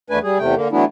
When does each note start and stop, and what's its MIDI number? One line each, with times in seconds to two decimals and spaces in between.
0.10 0.19 40
0.10 0.19 57
0.10 0.19 62
0.10 0.19 71
0.10 0.19 80
0.23 0.38 55
0.23 0.38 68
0.39 0.55 40
0.39 0.55 48
0.39 0.55 57
0.39 0.55 79
0.55 0.68 50
0.55 0.68 58
0.72 0.85 52
0.72 0.85 54
0.72 0.85 57
0.72 0.85 59
0.72 0.85 62
0.72 0.85 64